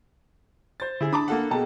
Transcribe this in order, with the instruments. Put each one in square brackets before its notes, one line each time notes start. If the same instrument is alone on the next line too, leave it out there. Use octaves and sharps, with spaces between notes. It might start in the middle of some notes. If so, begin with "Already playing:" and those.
[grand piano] C5 A6
[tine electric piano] D3 [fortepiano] E4 G#4
[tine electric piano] D4 [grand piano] A5 B5 [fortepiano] D6 D#6
[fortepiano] A#3 A4 F#5
[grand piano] B2 A5 [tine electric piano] G#4 G5